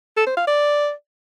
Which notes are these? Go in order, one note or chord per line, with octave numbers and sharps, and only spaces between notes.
A4
C5
F5
D5